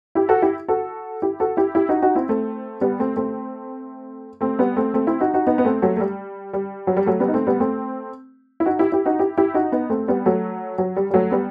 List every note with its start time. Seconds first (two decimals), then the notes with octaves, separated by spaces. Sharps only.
0.15 E4 G4
0.29 F#4 A4
0.42 E4 G4
0.68 F#4 A4
1.22 E4 G4
1.40 F#4 A4
1.57 E4 G4
1.75 E4 G4
1.89 D#4 F#4
2.02 D#4 F#4
2.15 C4 E4
2.29 A3 C4
2.81 G3 B3
2.99 A3 C4
3.16 A3 C4
4.41 A3 C4
4.59 G3 B3
4.76 A3 C4
4.94 A3 C4
5.07 C4 E4
5.20 D#4 F#4
5.34 D#4 F#4
5.47 B3 D#4
5.58 B3
5.65 A3 C4
5.82 F#3 A3
5.97 A3
6.01 G3
6.53 G3
6.87 F#3
6.97 G3
7.06 F#3 A3
7.20 G3 B3
7.28 D#4
7.34 A3 C4
7.47 G3 B3
7.60 A3 C4
8.60 E4
8.66 D#4 F#4
8.79 E4 G4
8.92 E4 G4
9.06 D#4 F#4
9.19 E4 G4
9.38 E4 G4
9.54 D#4 F#4
9.72 B3 D#4
9.90 A3 C4
10.08 G3 B3
10.26 F#3 A3
10.78 F#3
10.96 G3
11.10 G3
11.14 F#3 A3
11.31 G3 B3